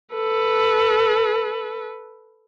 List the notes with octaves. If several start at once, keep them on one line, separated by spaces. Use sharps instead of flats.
A4 B4